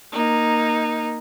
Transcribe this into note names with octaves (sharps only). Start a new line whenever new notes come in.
A#3 D#4